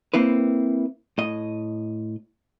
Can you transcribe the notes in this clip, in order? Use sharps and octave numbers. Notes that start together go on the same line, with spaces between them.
A#3 C4 E4 B4
A2 D#5